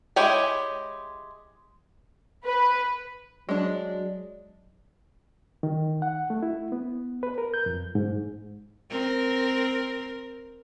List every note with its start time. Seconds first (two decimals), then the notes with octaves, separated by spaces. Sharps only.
0.16 G#3 E4 G4 C#5 G#5
2.45 B4
3.49 F#3 G#3 D4
5.63 D#3
6.02 F#5
6.30 A3
6.43 E4
6.72 B3
7.23 B4
7.38 A#4
7.54 G6
7.66 F2
7.95 G#2
8.90 C4 A#4